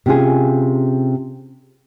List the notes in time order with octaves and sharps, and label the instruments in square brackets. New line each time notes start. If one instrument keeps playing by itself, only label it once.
[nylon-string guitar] C3 C#4 F4 G#4